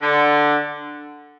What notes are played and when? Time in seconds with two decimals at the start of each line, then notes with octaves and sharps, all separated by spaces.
0.01 D3